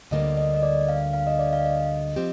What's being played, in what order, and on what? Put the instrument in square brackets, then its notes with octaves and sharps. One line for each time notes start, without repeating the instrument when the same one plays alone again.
[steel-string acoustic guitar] D2 D3 G3 A#3 [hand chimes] D#5
[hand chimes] D#5
D#5
D5
F5
F5
D#5
D5
F5
D#5
[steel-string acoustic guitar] F3 C4 G4